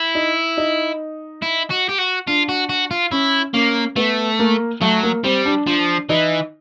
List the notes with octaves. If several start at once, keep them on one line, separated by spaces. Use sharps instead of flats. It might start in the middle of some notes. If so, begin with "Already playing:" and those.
Already playing: E4
D#4
D#4
E4
F#4
G4
F#4
D4 F4
F#4
F#4
F4
C#4 E4
A#3 C#4
A3 B3
A#3
F#3 A3
A#3
G3 C4
D4
F3 D4
E3 D#4